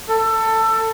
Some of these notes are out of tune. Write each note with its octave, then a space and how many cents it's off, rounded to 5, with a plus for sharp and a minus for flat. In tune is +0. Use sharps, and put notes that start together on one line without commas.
A4 +20